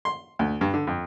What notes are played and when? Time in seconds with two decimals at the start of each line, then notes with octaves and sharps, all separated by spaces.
0.05 C6
0.39 D2
0.61 G2
0.74 D3
0.87 F2